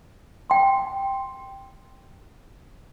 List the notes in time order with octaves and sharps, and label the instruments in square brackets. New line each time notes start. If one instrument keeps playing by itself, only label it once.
[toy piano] G5 C6